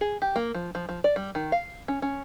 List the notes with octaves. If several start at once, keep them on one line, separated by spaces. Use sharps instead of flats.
G#4
G4
A#3
F3
F3
F3
D5
G3
D#3
F5
C#4
C#4